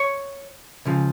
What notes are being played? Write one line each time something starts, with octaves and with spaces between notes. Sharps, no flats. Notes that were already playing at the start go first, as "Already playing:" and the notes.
Already playing: C#5
C#2 C#3 F3